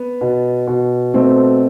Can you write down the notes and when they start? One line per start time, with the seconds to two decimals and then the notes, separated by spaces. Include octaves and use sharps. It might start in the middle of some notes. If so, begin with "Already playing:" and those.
Already playing: B3
0.21 B2
0.67 B2
1.14 B2 A3 C4